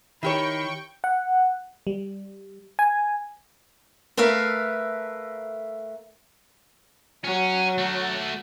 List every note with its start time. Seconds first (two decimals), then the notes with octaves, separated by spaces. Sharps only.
0.23 D#3 E4 G4 C#5 G5 B5 C#6
1.04 F#5
1.87 G3
2.79 G#5
4.17 A3 A#4 B4 E5 F5
7.24 F#3 C#4
7.78 A3 F#4